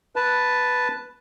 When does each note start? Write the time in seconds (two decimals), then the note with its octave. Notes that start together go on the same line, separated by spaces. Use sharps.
0.16 B4 A5